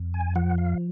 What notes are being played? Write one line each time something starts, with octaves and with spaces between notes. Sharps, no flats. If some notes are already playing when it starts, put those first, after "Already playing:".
Already playing: F2
G#5
F3 F#5
F5